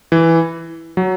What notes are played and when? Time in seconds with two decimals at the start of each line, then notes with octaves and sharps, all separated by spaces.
0.12 E3
0.97 F#3